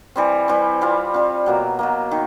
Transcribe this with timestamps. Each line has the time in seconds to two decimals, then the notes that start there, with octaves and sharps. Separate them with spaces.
0.16 E3 G3 C4
0.48 E3 G3 C4
0.81 G3 C4 F4
1.14 G3 C4 F4
1.46 B2 F#3 A#3
1.79 B2 F#3 A#3
2.11 D#3